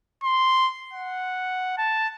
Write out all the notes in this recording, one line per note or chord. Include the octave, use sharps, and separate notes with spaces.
C6
F#5
A5